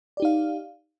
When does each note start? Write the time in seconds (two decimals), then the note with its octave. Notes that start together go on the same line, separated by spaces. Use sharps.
0.17 D5
0.20 G4
0.22 D#4
0.25 F5